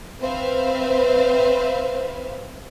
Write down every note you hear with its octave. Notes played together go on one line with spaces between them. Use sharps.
C4 B4 C5 E5 F5